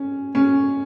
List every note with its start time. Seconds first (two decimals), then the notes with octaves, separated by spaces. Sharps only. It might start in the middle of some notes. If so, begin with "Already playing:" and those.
Already playing: C#4
0.35 C#4